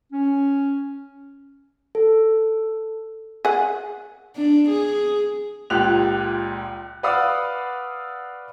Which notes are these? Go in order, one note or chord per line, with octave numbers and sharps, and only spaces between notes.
C#4
A4
G#4 F#5
D4
G#4
C#2 A#2 G4 F#6 F7
B4 D5 F5 F#5 D#6 E6